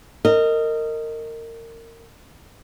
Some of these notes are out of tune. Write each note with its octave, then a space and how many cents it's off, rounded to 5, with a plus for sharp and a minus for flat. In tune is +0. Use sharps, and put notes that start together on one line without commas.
A#4 -25 D#5 +0